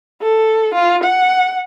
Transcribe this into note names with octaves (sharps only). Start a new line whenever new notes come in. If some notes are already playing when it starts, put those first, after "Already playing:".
A4
F4
F#5